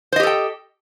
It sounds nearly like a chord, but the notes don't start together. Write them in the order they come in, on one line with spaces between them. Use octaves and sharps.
C5 D#5 G4 A4 G5